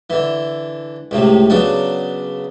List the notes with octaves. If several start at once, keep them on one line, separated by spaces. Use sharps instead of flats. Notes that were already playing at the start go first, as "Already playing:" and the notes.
D3 E3
C#2 A2 C3
C#3 F#3 B3 D4